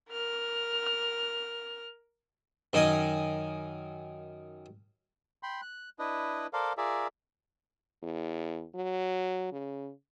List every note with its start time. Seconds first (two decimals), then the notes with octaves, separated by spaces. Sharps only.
0.10 A#4 F6
2.73 F#2 D#3 D#5 G#5 D#6
5.43 G5 B5 C6
5.62 F#6
5.99 D4 E4 B4 D#5
6.53 A4 A#4 C5 D5 F5
6.78 F4 G#4 A#4 D5 E5
8.03 E2
8.75 F#3
9.52 C#3